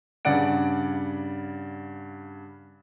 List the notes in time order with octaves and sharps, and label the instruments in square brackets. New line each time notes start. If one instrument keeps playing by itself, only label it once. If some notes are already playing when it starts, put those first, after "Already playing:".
[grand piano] G2 C#3 D5 F#5 D7